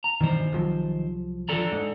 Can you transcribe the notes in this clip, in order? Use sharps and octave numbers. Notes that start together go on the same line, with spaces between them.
A#5
G2 B2 D#3 E3 C5
C2 F3 F#3
G#1 F3 A4 D5 A#5
G#2